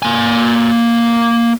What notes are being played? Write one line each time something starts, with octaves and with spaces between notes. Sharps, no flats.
A#3 G#5